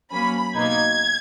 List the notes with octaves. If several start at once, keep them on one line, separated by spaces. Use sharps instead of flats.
F#3 A#3 C#4 B5
B2 A#3 D#4 G#6